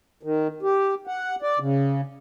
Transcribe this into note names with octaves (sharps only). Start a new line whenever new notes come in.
D#3
G4
F#5
D5
C#3